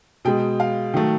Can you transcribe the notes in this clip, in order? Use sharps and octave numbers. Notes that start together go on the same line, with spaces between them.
B2 G#3 G5
F5
D#3 F#3 A3